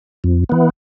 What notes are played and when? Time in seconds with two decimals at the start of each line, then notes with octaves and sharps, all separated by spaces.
0.24 F2
0.49 E3 B3